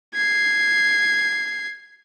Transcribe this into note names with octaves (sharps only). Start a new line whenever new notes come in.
G#6 C7